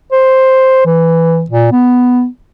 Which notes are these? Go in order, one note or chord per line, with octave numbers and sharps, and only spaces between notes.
C5
E3
A#2
B3